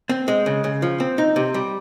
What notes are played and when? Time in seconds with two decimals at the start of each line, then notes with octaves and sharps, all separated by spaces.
0.09 C4
0.28 G#3
0.46 C#3
0.64 C#3
0.82 F3
1.00 C4
1.18 D#4
1.36 C3
1.54 G3